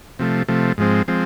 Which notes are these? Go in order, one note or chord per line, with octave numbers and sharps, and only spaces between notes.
C3 F3 A3
C3 F3 A3
G#2 F3 G#3 C4
F3 G#3 C4